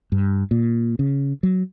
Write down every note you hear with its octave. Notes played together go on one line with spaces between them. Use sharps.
G2
A#2
C#3
F#3